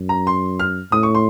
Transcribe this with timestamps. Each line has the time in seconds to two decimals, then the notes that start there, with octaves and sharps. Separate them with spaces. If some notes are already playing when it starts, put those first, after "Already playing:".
Already playing: F#2
0.09 A#5
0.27 C6
0.60 F6
0.92 A2 D#6
1.03 C#6
1.15 C6